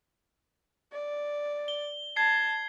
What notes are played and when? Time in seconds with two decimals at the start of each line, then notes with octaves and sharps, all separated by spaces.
0.92 D5
1.68 G7
2.16 A5 G#6 C7